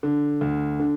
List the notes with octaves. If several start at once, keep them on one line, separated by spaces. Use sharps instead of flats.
D3
D2
D3